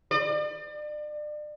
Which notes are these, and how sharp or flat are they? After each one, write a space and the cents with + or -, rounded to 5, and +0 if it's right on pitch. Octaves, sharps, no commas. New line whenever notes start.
D5 +35